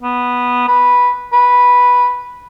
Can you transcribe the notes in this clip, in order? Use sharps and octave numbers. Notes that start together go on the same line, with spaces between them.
B3
B4
B4